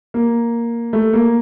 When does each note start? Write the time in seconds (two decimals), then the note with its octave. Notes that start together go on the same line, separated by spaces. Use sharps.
0.14 A#3
0.93 A3
1.13 A#3